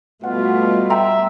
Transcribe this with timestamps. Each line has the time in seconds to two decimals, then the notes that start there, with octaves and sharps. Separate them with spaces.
0.24 B2 G3 A3 F4 F#5
0.90 E5 G5 A#5 C6